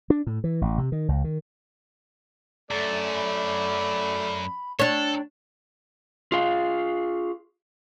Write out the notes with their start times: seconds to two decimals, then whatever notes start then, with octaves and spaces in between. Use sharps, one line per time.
0.10 D4
0.27 A2
0.44 E3
0.61 A1
0.78 C3
0.92 D#3
1.08 C#2
1.24 D#3
2.71 F#2 A3 D5 A6
3.14 B5
4.79 D4 A4 C#5 G5
6.32 F4 G#4 F5